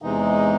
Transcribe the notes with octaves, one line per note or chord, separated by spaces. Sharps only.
E2 C3 E3 G#3 D#4